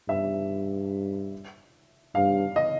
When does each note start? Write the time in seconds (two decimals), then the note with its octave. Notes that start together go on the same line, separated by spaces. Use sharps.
0.09 G2 E5
2.15 G2 F5
2.56 D#5